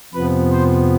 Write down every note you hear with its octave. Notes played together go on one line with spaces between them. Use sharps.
F2 C3 F3 B3 B4
C5